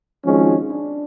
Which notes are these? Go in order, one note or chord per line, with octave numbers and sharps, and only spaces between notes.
G#1 G#2 F3 G#3 C#4
D4